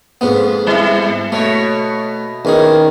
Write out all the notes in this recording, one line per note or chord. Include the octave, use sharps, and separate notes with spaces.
F2 G#2 B3
G3 E4
B2 A3 C#5
E2 D#3 C#4 G#4